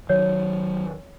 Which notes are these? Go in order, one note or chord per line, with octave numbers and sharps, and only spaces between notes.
D#3 F#3 C#5